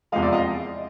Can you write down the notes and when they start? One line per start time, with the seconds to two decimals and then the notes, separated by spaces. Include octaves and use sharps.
0.12 E2 C3 F3 G#3 D#5 F5
0.22 D5 E5
0.32 D#5 F5